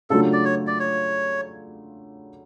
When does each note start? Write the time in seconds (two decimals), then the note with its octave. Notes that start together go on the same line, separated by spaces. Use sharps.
0.10 C#3 F#3 A3 D4 F4 A4
0.33 D5
0.45 C#5
0.67 D5
0.79 C#5